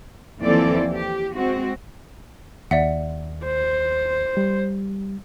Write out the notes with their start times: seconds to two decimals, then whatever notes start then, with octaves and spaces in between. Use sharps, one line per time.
0.40 D#2 E3 F3 C4 A4 D5
0.91 G4
1.35 G#3 C4 F#4
2.71 D#2 D5 E5 F#5
3.45 C5
4.37 G3